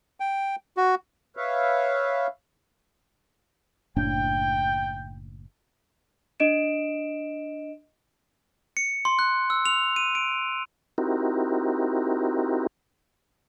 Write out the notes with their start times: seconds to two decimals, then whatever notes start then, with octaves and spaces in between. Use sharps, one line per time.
0.20 G5
0.77 F#4
1.37 B4 C#5 E5 F5
3.96 F#1 A2 D4 G5
6.40 D4 D#5 D7 E7
8.77 C#7
9.05 C6
9.19 F#6
9.50 E6
9.65 F7
9.96 D#7
10.15 D7
10.98 C4 D#4 E4 F#4 G4 A#4